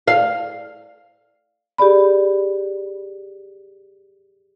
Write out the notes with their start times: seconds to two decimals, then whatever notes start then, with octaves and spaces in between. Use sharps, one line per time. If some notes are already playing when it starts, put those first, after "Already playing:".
0.08 F5
1.78 G4 G#4 D5 B5